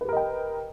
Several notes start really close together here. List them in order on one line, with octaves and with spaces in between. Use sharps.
B4 G4 A#4 D#5 G5